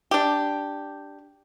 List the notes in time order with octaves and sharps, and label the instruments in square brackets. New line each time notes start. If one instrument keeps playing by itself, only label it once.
[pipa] D4 G4